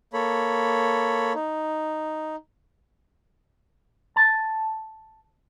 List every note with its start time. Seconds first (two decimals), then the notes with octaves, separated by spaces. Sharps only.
0.13 A#3 A4 C#5 B5
1.35 D#4
4.16 A5